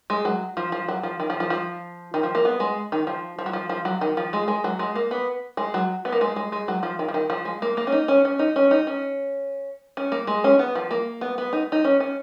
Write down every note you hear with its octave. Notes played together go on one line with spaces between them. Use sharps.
G#3
F#3
F3
F3
F#3
F3
D#3
F3
F3
F3
D#3
F3
A#3
B3
G#3
D#3
F3
F3
F#3
F3
F3
F#3
D#3
F3
G#3
G#3
F#3
G#3
A#3
B3
G#3
F#3
B3
A#3
G#3
G#3
G#3
F#3
F3
D#3
F3
D#3
F3
G#3
A#3
A#3
C#4
D#4
C#4
C#4
D#4
C#4
D#4
C#4
C#4
A#3
G#3
C#4
B3
F3
A#3
B3
B3
D#4
D#4
C#4
C#4